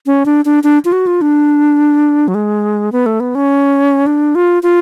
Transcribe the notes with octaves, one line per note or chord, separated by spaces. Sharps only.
C#4
D4
D4
D4
F4
F#4
F4
D4
F#3
G#3
B3
A3
B3
C#4
D4
F4
F4